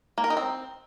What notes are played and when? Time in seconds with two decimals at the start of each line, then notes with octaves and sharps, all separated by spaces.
0.18 A#3
0.24 A#4
0.30 D#4
0.37 C4